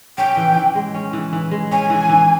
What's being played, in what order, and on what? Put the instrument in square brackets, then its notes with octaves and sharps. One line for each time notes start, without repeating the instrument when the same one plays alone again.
[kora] C#4 [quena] G5
[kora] E3
E3
G#3
C#4
E3
E3
G#3
[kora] C#4 [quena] G#5
[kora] E3
E3